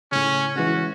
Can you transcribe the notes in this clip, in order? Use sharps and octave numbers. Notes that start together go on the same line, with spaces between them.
A2 C#3 C#4
E3 G#3 C#4 F#4